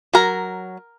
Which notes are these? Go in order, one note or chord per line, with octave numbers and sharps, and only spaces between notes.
F#3 A#4 A#5